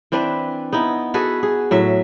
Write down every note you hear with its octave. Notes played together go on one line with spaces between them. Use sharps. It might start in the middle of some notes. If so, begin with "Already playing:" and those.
E3 C4 D4 B4
B3 D#4 E4
F#4 G#4 A4 B4
G#4
A2 F#3 E5